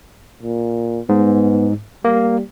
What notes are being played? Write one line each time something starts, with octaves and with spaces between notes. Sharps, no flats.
A#2
G#2 B3
G3 A#3